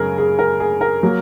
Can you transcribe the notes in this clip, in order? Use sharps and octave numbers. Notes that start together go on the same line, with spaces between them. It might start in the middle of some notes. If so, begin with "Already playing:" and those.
Already playing: F#2 C#3 G#3 G#4 A#4
G#4
A#4
G#4
A#4
F#3 A#3